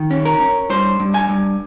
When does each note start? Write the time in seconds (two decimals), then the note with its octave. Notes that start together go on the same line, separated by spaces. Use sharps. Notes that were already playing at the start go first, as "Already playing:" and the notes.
Already playing: D#3
0.11 C#4
0.25 A#4
0.40 C#4
0.70 G2 C5
1.00 G2
1.14 G#5
1.29 G2